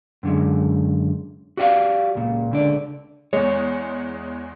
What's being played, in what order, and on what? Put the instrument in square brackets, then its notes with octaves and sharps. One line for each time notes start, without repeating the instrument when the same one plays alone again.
[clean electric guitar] F#2 D3 G#3
F#4 G4 D5 D#5 F5
C#2 A#2
C#2 D3 D5
[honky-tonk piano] E2 G#3 [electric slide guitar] C#5